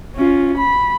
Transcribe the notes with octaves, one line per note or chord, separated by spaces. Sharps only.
C#4 F4
B5